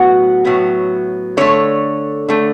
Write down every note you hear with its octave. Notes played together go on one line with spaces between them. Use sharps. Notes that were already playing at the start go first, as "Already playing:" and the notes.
Already playing: A2 F#3 B3 F#4
A2 F#3 B3
D3 A3 C#5
D3 A3